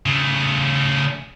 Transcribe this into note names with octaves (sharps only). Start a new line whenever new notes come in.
C#3 A3